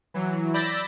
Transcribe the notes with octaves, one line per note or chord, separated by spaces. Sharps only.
E3 F#3
D5 B5 E6 G6 A6 A#6